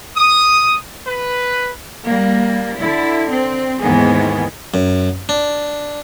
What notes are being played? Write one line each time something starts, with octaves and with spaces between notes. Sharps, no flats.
D#6
B4
G3 A#3
D3 E4
C4
D#2 G#2 D#3 E3 B3 G#4
F#2
D4